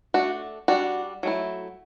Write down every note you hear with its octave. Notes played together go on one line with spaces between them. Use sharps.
A3 D4 F#4
G3 D4 F#4
F#3 A3 E4